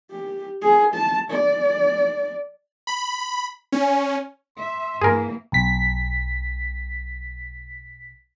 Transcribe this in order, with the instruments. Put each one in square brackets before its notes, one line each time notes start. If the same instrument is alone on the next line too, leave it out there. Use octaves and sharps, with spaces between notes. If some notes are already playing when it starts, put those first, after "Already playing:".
[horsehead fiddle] G4
G#4
A5
D5
[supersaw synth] B5
C#4
[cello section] E5 [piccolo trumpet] C6
[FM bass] G2 [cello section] E3 A#3 [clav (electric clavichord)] G#4 A#4
[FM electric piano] B1 B6